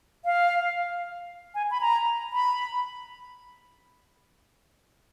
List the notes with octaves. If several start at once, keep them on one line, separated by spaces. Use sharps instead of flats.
F5
G#5
B5
A#5
B5